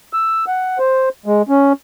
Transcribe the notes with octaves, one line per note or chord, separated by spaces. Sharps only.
E6
F#5
C5
G#3
C#4